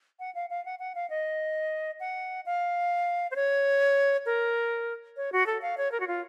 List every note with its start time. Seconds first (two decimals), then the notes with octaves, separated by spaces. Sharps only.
0.20 F#5
0.35 F5
0.50 F5
0.65 F#5
0.79 F#5
0.95 F5
1.10 D#5
2.00 F#5
2.46 F5
3.31 C5
3.36 C#5
4.26 A#4
5.17 C#5
5.32 F#4
5.46 A4
5.62 F5
5.78 C#5
5.92 A#4
6.00 F#4
6.07 F4